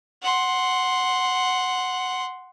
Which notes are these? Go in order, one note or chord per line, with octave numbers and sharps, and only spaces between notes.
F#5 C6